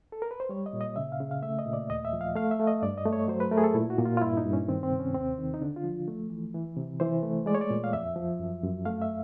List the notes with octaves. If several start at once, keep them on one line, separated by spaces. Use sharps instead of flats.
A4
A#4
B4
C5
G3 C#5
D#5
A#2
D#5
C#3 E5
F5
C#3
F5
A3 E5
D#5
A#2
D5
D#2 D#5
E5
F3
F5
A3 F5
E5
A3
D#5
G2 D5
D#5
A3
C#5
F#3 C5
B4
A3 A#4
G#4
A4
A#2 E4
F#4
A#2
F4
F4
G2 E4
D#4
G2
C#4
D#3 C4
C4
C3
C#4
D#2 C4
D#3
D#4
D3 D4
F4
F3
A3
E3
E3
C3
E3 C5
A3
G#3 D5
C#5
D5
A#2
F5
F2 E5
F3
F#2
F#2
A3 F5
E5